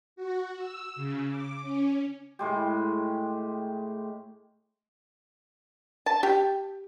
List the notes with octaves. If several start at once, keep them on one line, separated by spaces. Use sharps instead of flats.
F#4
E6
C#3
D6
C#4
A2 G#3 G4
A5
G4